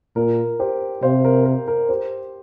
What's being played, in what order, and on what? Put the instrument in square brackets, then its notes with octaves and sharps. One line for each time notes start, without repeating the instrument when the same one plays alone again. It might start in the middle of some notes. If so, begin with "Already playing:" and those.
[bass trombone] A#2 [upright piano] A#4
[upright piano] G4 C5
[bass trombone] C3 [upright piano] C5 F5
[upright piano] A#4
A#4
A#4
G4 C5